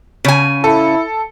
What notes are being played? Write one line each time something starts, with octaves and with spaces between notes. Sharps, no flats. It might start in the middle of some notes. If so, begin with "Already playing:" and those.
C#3 G#5
E4 A4